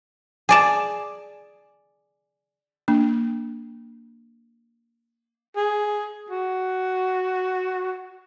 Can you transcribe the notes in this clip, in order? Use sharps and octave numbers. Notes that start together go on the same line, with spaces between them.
G#4 D5 A5
A#3 D4
G#4
F#4